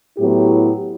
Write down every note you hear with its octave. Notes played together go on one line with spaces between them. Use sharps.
A2 F#3 B3 E4 G4